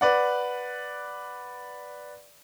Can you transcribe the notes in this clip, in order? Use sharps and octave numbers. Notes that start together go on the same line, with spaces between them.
B4 D5 F#5